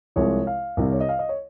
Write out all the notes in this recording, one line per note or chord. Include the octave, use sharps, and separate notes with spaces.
C2 C3 F3 G#3 C#5
F5
C2 C3 G3
C#5
D#5
F5
D#5
C#5